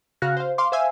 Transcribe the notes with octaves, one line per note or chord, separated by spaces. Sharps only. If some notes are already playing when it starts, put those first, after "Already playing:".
C#3 F#4 F5 F6 F#6 A#6
C5 F5
F5 C6 D6
C5 E5 F5 G#5 E6